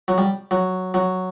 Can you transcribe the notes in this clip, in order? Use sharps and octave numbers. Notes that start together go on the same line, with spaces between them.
F#3
G3
F#3
F#3